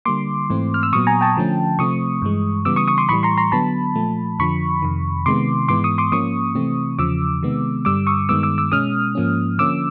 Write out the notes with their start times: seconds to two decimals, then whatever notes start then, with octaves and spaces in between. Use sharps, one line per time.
0.05 D3 G3 A#3 C6 D6
0.50 G#2 E3 A3 C4
0.74 F6
0.83 E6
0.93 A#2 F#3 B3 C#6 D#6
1.07 G#5 A#5
1.21 G5 A5
1.37 D3 F3 A3 C#4
1.79 C3 F3 A3 C4 C#6 D#6
2.22 G2 E3 G#3
2.65 C#3 E3 G3 B3 D6 E6
2.76 C#6 D#6
2.88 C#6 D#6
2.98 C6 D6
3.09 A2 E3 G3 B5 C#6
3.23 A#5 C6
3.37 A#5 C6
3.52 D3 F#3 B3 A5 B5
3.95 A#2 F3 A3
4.39 F2 D3 F3 B5 C#6
4.82 F2 C3 D#3
5.26 C3 D#3 G#3 B3 C6 D6
5.68 G#2 E3 G#3 B3 C6 D6
5.84 C#6 D#6
5.98 C6 D6
6.12 G#2 F3 A#3 C#4 C#6 D#6
6.55 C3 E3 A3 C4
6.98 E2 C#3 F3 D6 E6
7.43 C3 D#3 G#3 B3
7.85 G2 D3 G3 D6 E6
8.07 C#6 D#6
8.29 G2 D#3 G#3 B3 D6 E6
8.43 D6 E6
8.58 D6 E6
8.72 B2 G#3 C#4 D#6 F6
9.15 G#2 F3 A#3 C#4
9.59 D3 F3 A#3 C#4 D6 E6